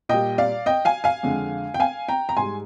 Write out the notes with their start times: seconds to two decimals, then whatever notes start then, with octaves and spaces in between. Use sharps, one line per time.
0.09 A#2 G3 D#5 G5
0.38 D5 F5
0.66 D#5 G5
0.85 F5 G#5
1.04 F5 G#5
1.23 F2 D3 G#3
1.74 G5
1.80 F5 G#5
2.08 G5 A#5
2.29 A#5
2.37 G#2 G3 G#5 C6